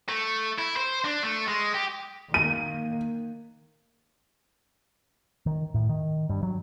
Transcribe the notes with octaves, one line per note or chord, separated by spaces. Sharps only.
A3
E4
C5
D4
A3
G#3
G4
D#3 A#3 D#7
D#3
A2
D#3
G2
F#3